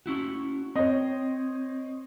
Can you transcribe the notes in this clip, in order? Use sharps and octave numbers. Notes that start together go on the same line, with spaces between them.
C#4 E4 F#4
C4 C#5 D#5